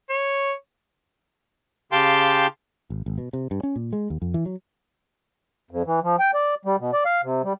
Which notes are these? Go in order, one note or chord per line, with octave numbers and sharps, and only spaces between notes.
C#5
C#3 G4 F5 G5 A5 C6
G#1
G#1
B2
C3
G2
C#4
A#2
G#3
D#2
F2
E3
F#3
F2
E3
F3
G5
D5
G3
B2
D5
F5
C3
G3